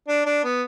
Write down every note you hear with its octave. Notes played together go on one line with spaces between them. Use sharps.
D4
D4
B3